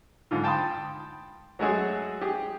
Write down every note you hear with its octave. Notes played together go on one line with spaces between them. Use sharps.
G#2 D3 F4
G5 A5 B5 C6 D#6
F#3 G#3 A3 F#4 G#4
G4 G#4